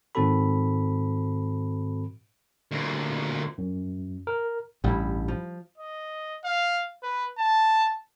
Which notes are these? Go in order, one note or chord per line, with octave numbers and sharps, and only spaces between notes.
G#2 D#3 C4 F#4 A4 B5
D2 A#2
F#2
A#4
A1 G2 G3 E4
F3
D#5
F5
B4
A5